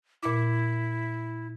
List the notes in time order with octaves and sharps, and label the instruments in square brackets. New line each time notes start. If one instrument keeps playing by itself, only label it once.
[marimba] A#2 D6 [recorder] E4